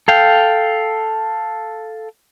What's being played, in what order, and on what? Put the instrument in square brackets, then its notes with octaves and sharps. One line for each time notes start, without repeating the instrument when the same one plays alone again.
[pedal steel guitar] A4 F5 G5